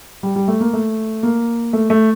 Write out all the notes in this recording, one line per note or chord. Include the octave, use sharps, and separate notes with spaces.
G3
G3
A3
A#3
A3
A#3
A3
A3